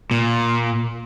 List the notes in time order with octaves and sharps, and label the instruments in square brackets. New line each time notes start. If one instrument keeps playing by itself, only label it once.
[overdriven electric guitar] A#2